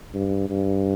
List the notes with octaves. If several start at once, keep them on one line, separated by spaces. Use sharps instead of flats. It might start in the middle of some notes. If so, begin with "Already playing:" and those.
G2
G2